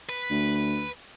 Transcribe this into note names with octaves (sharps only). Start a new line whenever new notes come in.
B4
D2